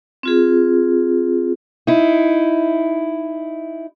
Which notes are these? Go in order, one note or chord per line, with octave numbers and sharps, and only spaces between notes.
C4 F4 G#4
D#4 E4